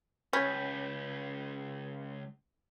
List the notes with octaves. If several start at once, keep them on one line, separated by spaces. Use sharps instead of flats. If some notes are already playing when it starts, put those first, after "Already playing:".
C#2 C#4 B5 G6 B6